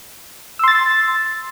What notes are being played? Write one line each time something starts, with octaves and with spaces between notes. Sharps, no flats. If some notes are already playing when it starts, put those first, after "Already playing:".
C6 E6 A6